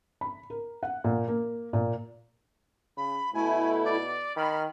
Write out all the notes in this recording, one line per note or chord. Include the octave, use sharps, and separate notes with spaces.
B5
A#4
F#5
A#2
A#3
A#2
C#3 B5
B2 A3 E4 G#5
D5
D#3 B5 F6